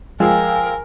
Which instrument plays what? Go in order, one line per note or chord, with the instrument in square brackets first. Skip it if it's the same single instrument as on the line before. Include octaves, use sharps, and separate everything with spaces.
[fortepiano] F3 G#3 [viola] A#4 [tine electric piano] F5 G5 E6 [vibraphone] G#5